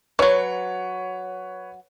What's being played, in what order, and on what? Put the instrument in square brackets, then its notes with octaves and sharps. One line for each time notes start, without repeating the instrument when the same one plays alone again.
[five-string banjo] E3 F#3 [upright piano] B4 C#5